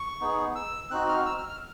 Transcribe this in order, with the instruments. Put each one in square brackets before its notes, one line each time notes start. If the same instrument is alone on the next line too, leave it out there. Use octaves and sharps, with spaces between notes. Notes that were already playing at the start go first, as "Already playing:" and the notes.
Already playing: [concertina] C#6
B3 D#4 G#4
E6
C4 D#4 F#4 F#6
F6
E6
F6
F6